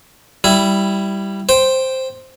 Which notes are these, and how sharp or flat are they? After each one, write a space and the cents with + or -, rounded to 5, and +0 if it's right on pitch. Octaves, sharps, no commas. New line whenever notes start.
G3 +0 E4 +5
C5 +0 G5 +0